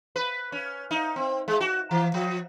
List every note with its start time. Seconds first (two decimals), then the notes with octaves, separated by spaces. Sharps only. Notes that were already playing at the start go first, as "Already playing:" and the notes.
0.16 B4
0.52 C#4
0.91 D#4
1.16 C4
1.48 G#3
1.61 F#4
1.91 E3
2.14 F3